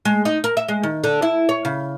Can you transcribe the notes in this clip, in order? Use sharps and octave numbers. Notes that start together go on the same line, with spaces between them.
G#3
D#4
A#4
E5
G#3
D#3
D3
E4
C#5
C#3